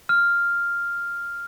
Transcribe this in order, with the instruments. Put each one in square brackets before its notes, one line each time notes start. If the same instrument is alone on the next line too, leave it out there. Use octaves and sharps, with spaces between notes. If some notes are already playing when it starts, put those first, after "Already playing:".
[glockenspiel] F6